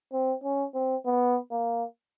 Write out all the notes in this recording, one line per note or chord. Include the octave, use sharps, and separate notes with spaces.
C4
C#4
C4
B3
A#3